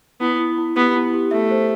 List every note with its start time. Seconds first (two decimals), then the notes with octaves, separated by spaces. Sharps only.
0.21 B3 E4
0.39 E4
0.58 E4
0.76 B3 G4
0.95 E4
1.14 G4
1.31 A3 E5
1.51 C5